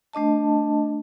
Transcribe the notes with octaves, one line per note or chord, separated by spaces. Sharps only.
A3 D4 D#5 A5